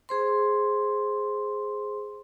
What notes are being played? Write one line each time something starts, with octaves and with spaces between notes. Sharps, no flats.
G#4 C5 C6